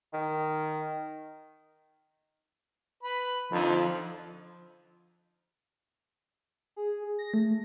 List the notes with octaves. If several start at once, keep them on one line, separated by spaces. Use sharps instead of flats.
D#3
B4 B5
F2 D3 F3 D#4
G#4
A#6
A3